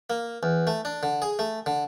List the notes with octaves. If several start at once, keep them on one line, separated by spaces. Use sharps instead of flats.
A#3
E2
A3
D4
D3
G#4
A3
D3